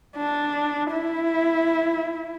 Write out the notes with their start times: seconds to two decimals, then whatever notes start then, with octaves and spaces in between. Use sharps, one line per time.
0.17 D4
0.91 E4